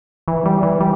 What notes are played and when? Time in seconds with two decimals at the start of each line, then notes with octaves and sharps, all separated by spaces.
0.28 E3
0.46 G3
0.63 E3
0.80 G3